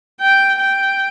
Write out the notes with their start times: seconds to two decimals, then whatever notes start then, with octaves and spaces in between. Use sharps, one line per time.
0.21 G5
0.59 G5